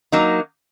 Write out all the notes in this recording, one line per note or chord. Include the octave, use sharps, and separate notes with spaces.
F#3 A#3 D#4